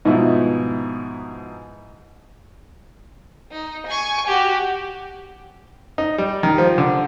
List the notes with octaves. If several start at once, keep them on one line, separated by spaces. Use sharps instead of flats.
G#2 B2 F3 D#4 E4
D#4
G#5 C#6
F#4 G4
D#4
G3
D#3
F3
D3